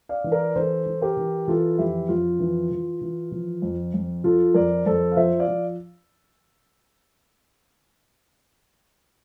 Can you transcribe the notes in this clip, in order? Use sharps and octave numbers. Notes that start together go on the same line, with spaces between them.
D5 F5
E3
A#4 D5
E3 A4 C5
E3
G4 A#4
E3
E3 F4 A4
F2 E4 G4
F2 F4
E3
E3
E3
F3
F2
F2
F3 F4 A4
F2 A#4 D5
F2 A4 C5
F5
F3 C5 E5
D5 F5
F3